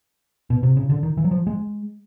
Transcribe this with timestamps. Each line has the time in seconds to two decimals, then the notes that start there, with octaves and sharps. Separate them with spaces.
0.50 B2
0.63 C3
0.77 C#3
0.89 D3
1.03 D#3
1.17 E3
1.24 F#3
1.31 F3
1.47 G#3